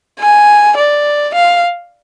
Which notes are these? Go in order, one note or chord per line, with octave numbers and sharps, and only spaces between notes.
G#5
D5
F5